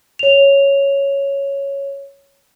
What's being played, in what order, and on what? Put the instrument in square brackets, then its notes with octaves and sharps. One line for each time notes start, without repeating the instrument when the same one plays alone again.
[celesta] C#5 F7